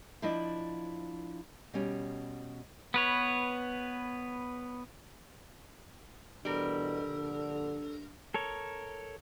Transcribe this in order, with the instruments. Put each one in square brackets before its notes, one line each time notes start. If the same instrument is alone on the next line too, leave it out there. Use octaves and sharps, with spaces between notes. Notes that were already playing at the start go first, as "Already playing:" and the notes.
[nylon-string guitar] F3 D4 E4 D5 D#5
B2 G3 C#4
[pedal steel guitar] B3 B4 C#5
[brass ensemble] E2 B2 [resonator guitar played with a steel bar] G3 A#4 [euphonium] D4 [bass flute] A4
[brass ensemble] A#1 G2 D3
[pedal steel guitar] A4 A#4 C#5